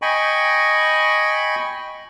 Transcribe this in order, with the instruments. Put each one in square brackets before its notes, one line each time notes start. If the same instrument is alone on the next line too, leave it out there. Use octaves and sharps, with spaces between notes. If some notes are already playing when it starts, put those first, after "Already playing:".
[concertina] D#5 G5 G#5 B5 C#6